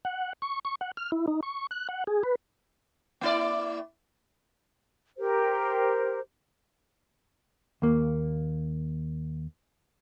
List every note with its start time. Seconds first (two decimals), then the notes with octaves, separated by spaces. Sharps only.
0.05 F#5
0.42 C#6
0.65 C#6
0.81 F#5
0.97 F6
1.12 E4
1.28 D#4
1.43 C#6
1.71 F#6
1.89 F#5
2.07 G#4
2.23 B4
3.21 A#3 E4 D5
5.18 G4 A#4 C5
7.82 D#2 A#3